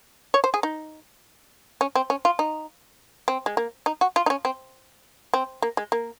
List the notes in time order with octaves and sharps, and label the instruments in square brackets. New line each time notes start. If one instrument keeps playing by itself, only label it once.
[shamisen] C#5
C5
G#4
D#4
C#4
C4
C#4
F4
D#4
C4
G#3
A#3
D#4
F#4
F4
D#4
C#4
C4
C4
A#3
G#3
A#3